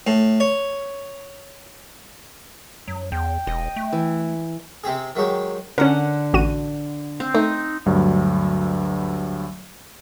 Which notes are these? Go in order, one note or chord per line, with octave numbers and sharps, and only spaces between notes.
A2
C#5
F#2 F#3
E2 G5
E1 D#5
A3
E3
C3 C4 G4 G#4
D#3 F#3 G#3 G4
D3 C#4 A#4 F#5
A1 F#4 D#7
C4
A3 D#4
D2 G2 F#3